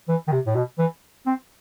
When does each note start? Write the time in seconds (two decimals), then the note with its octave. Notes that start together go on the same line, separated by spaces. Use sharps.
0.08 E3
0.28 D#3
0.32 C3
0.46 A2
0.55 B2
0.78 E3
1.26 C4